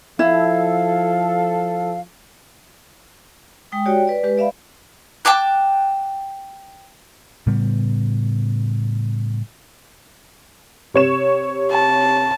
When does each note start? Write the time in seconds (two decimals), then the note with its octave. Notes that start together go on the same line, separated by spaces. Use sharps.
0.19 F3 E4 A4 F5
3.72 G#3 G5 D#6
3.86 F#4 G4 C#5 D5 G5
4.07 B4 D5
4.23 G#3 G4 B4
4.38 D5 E5 F5 B5
5.25 G5 A5 D6 F#6
7.47 A2 C#3 G3 B3
10.94 C3 C#5 E7
11.71 A5